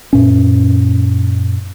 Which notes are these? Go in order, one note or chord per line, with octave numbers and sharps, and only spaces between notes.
F#2 A#2 C#4